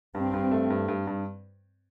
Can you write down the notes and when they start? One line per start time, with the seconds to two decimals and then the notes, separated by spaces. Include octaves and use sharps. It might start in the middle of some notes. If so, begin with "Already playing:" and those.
0.15 G2 C4
0.33 G2
0.51 A3
0.70 G2
0.88 G2
1.07 G2